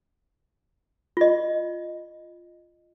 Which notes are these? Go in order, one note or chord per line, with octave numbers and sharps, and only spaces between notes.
F4 D#5